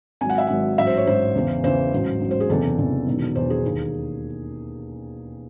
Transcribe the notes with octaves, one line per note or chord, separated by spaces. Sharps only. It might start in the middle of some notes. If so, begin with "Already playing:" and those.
G#1 G#2 F#3 G#5
F#5
E5
G#1 G#2 F#3 F#5
A1 G#2 F#3 E5
C5
C#5
A1 G#2 F#3 C5
E2 C#3 E3
E2 C#3 E3 C5
A1 G#2 F#3
A1 G#2 F#3
C5
G#4
F#1 E2 C3 E3 A4
F#1 E2 C3 E3
E1 E2 D#3 F#3
E1 E2 D#3 F#3 C5
G#4
E1 D#2 D#3